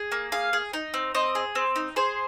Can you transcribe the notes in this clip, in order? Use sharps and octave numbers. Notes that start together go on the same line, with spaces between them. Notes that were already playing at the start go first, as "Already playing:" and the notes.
Already playing: G#4
A#3
G#4 F5
G#4
D#4
C4
C4 D#5
G#4
C4
D#4
G#4 C5